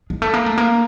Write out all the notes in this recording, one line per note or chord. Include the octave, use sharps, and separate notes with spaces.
G#3
A3
A#3
A3
A#3